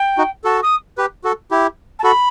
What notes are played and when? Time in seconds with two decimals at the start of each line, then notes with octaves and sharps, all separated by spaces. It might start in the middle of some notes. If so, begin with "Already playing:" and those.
Already playing: G5
0.18 D#4 F#4
0.44 F#4 A4 A5
0.62 D#6
0.98 G4 B4
1.24 F#4 A4
1.51 E4 G4
1.99 A5
2.04 F#4 A4 B5